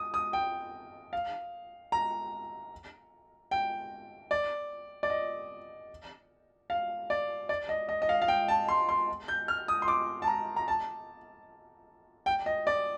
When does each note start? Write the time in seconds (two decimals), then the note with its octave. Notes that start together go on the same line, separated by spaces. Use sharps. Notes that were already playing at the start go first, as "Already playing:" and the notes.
Already playing: D#6
0.14 D#6
0.33 G5
1.13 F5
1.92 A#5
3.51 G5
4.31 D5
5.03 D5
5.10 D#5
6.70 F5
7.10 D5
7.49 D5
7.69 D#5
7.89 D#5
8.02 D#5
8.09 F5
8.22 F5
8.28 G5
8.48 A5
8.68 C6
8.89 C6
9.28 G6
9.48 F6
9.68 D#6
9.82 C6
9.88 D6
10.22 A5
10.27 A#5
10.56 A#5
10.68 A5
12.26 G5
12.46 D#5
12.67 D5